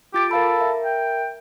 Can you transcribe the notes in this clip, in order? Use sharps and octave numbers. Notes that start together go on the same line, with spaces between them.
F4 G4 A6 D7
A4 A#4 F5 B5
A#4 E5
G5